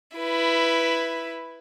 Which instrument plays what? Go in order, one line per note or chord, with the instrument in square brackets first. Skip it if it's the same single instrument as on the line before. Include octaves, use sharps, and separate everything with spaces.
[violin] E4 B4